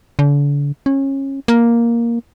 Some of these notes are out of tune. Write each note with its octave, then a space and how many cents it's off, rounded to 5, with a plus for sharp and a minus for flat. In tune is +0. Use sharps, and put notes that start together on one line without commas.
D3 -40
C#4 -25
A#3 +5